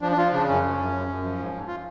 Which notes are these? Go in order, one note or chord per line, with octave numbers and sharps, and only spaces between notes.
F3 D4
D4
F3 F4
C#3 D4
F#2 C#4
F#2
F#2
F#2
F#2
F3
G#2
G#2
F4